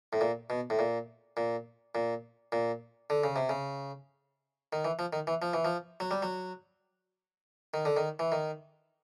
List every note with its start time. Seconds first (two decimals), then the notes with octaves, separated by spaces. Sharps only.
0.13 A2
0.21 A#2
0.50 B2
0.70 A2
0.79 A#2
1.37 A#2
1.95 A#2
2.52 A#2
3.10 D3
3.24 C#3
3.36 C3
3.49 C#3
4.73 D#3
4.85 E3
4.99 F3
5.13 D#3
5.27 E3
5.42 F3
5.53 E3
5.65 F3
6.00 F#3
6.11 G3
6.22 F#3
7.74 D#3
7.85 D3
7.97 D#3
8.19 E3
8.32 D#3